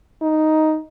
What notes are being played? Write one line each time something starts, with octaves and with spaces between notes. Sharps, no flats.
D#4